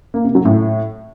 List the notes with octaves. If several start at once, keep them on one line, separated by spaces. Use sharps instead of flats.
A#3
C3
F#3
A2